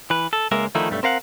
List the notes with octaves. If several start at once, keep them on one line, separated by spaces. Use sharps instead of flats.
E3 B4
A4
C#2 G#3 A#3 A#4 E5
D3 D#3 F3 A3 D#4 E4
B1 G2 G3 A3
C4 A#4 F5 F#5